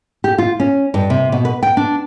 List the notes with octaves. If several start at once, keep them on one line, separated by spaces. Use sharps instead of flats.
G4
F4
C#4
G2
C3
B2
B4
G5
D4